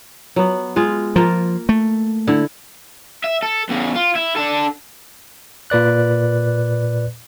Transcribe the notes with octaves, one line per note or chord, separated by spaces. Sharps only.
F#3 B3
G#3 F4 F5
F3 A#3 F4 A#4
A3
D3 E4 F#5
E5
A4
E2 C#3
F4
E4
D4 A4
A#2 B4 D5 F#6